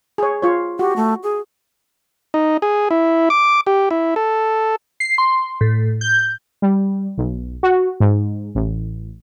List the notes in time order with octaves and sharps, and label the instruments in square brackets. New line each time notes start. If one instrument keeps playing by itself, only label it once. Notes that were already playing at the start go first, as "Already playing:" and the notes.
[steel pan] G#4 C#5
F4 C#5
[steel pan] F#4 [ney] G4
[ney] A3
G#4
[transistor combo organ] D#4
G#4
E4
D6
G4
E4
A4
[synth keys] C7
C6
A2
G6
[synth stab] G3
B1
F#4
G#2
A1